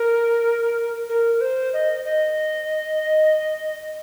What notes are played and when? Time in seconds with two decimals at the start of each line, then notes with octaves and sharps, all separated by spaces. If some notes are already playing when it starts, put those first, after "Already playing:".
Already playing: A#4
1.09 A#4
1.41 C5
1.74 D#5
2.05 D#5